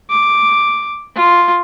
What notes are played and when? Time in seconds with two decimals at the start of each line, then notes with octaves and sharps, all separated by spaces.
0.10 D6
1.15 F4